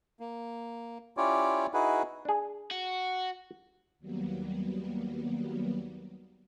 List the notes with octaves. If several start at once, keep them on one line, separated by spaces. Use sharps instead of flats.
A#3
C#4 E4 F4 G4 C#5 D5
D#4 E4 F#4 G#4 B4
D4 G#4
F#4
D#2 F#3 G3 A#3 B3